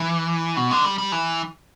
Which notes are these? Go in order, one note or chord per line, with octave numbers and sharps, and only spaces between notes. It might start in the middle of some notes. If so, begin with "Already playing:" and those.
Already playing: E3
B2
D3
G3
G3
E3